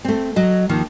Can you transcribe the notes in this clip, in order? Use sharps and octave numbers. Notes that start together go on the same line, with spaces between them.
A3 C4
F#3 D#5
D#2 D#3 F3